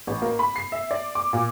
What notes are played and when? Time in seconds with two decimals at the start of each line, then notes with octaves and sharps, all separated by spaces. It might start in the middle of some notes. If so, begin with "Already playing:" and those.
0.07 A1
0.22 A#3
0.39 B5
0.56 C7
0.72 E5
0.91 D5
1.15 D6
1.33 A#2